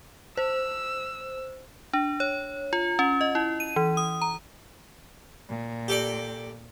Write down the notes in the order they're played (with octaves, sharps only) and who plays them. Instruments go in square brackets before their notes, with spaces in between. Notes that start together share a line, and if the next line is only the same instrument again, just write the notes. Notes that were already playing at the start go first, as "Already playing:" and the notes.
[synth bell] C5 [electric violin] E6
[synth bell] D4
C#5
F4
C#4
D#5
E4
D#7
E3
D#6
A#5
[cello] A#2
[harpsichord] G4 A4 D5